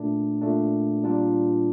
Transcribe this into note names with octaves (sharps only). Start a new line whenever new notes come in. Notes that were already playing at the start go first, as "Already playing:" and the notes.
Already playing: A#2 A3 D4
A#2 A3 D4
A#2 G3 D4 F4